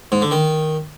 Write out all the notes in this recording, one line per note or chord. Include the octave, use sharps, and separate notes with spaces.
G#2
D3
D#3